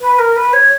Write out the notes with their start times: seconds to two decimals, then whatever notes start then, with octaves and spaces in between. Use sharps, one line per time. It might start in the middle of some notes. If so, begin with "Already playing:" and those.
0.01 B4
0.19 A#4
0.36 B4
0.53 C#5